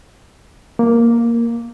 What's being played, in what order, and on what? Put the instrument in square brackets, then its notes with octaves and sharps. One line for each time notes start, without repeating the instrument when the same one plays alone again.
[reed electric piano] A#3